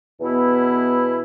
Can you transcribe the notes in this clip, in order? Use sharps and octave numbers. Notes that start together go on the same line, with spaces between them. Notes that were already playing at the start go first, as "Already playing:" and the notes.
E2 B2 B3 E4